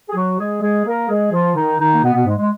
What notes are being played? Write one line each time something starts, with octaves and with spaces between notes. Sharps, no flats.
G#4
F#3 F#4
G#3 G#4
G#3 G#4
A#3 A#4
G#3 G#4
F3 F4
D#3 D#4
D#3 D#4
A#3
B2 B3
B2 B3
G#2 G#3
G#3